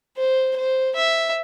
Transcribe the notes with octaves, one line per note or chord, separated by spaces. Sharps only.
C5
C5
E5